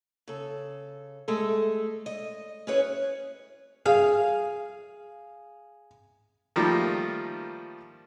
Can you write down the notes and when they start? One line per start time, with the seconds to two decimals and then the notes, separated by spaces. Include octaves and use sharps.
0.28 C#3 A4
1.28 G#3 A3 A4
2.06 D#5
2.67 C#4 E4 G#4 B4 C#5
3.86 G#4 F5
6.56 D#3 F3 G3 A3 A#3